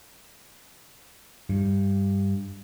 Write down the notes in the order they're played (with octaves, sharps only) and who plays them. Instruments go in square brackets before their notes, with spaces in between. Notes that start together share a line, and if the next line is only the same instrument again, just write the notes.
[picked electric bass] G2